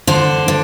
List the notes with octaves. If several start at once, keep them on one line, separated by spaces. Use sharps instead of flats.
D3 C5
D3